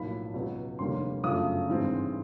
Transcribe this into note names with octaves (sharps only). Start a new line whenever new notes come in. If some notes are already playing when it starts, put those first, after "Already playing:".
Already playing: B1 A2 F3 A#3 B5
C#2 B2 F#3 B3
F1 D#2 D3 G3 A#3 C6
G1 F#2 C#3 F3 A3 D#6
G#1 G2 E3 G#3 C4